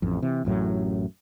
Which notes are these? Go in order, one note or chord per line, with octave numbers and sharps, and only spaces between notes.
A1 F2
C3 E3
A1 F#2 A2 F#3